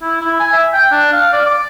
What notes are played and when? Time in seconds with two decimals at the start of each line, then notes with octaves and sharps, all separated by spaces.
0.02 E4
0.21 E4
0.40 G#5
0.53 E5
0.73 G5
0.91 D4
1.12 F5
1.33 D5
1.46 D6